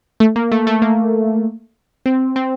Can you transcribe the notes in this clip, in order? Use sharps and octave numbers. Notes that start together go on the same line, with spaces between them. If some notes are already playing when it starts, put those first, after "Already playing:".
A3
A#3
A3
A3
A#3
C4
C4